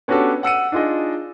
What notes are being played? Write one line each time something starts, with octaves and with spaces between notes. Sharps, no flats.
B3 C#4 D4 F#4 G4 A4
F#5 E6 C#7 D#7
D4 D#4 F4 G#4 D#5